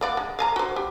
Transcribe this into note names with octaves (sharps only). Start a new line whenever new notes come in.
A#3 D5 F#5
G#3
F5 G#5 A#5
F#4 C5
G4